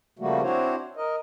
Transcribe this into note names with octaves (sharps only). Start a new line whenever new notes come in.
C#3 F3 G3 A3 A#3 F#4
C4 D4 E4 F#4 C5 C#5
A#4 D#5